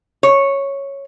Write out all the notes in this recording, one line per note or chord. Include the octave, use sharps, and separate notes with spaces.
C#5